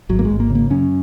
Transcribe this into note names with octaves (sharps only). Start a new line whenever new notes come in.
G#1 F#3
A#3
G#3
G#1
A#3
C#3
A#3
F#2 C#4